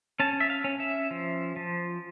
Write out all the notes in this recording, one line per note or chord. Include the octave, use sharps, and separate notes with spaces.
C#4 A5
E5
F5
C#4
E5
F3
F3